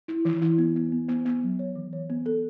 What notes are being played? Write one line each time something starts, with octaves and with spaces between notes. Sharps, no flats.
E4
E3
E4
B3
B3
B3
B3
B3
F#3
C#5
E3
C#5
B3
A4